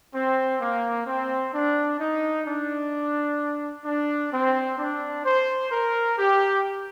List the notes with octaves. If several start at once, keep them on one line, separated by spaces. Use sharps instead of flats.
C4
A#3
C4
D4
D#4
D4
D4
C4
D4
C5
A#4
G4